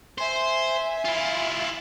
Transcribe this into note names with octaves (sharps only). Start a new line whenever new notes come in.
C5 E5 G#5
E4 F4